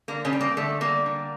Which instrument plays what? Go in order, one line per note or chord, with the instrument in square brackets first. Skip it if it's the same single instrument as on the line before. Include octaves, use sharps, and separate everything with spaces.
[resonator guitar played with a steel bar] D3 A#3
C#3 C#4
G3
A#3
D3 A3
G3 A#3
D3